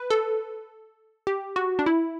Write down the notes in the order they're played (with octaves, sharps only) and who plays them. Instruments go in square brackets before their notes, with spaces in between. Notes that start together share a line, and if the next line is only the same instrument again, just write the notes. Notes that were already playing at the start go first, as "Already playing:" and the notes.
Already playing: [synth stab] B4
A4
G4
F#4
D4
E4